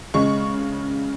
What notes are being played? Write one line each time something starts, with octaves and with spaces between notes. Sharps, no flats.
C#3 G#3 C#6